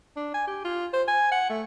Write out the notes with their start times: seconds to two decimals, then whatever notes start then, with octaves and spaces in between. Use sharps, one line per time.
0.16 D4
0.34 G#5
0.47 G4
0.64 F4
0.93 C5
1.08 G#5
1.31 F#5
1.50 A3